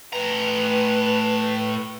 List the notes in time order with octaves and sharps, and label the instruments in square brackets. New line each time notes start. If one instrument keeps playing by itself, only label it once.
[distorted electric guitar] A2 A#5 [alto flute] B4